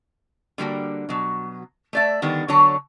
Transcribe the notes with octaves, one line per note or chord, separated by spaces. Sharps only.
D3 G3 A#3 F#4
B2 F#3
A3 D5 E5
D3 D#3 G3 B3
D3 F#3 C#5 A5